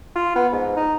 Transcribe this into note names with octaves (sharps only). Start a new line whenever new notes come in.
F4
B3
G#2
D#4